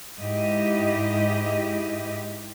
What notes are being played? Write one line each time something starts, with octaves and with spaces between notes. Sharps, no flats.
G#2 E4 G4 D#5